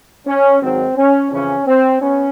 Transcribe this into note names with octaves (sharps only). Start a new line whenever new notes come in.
C#4
G#1 G#2 D#3 F#3 C4
C#4
F2 C#3 E3 C#4
C4
B3 C#4